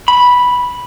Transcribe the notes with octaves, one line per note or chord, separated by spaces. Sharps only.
B5